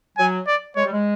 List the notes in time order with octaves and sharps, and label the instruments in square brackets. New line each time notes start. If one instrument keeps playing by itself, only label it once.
[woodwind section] F#3 [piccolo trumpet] G#5
[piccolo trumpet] D5
[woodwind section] G#3 [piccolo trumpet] C#5
[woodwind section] G3
G#3